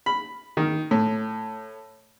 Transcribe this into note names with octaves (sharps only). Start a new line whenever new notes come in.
B5
D#3
A2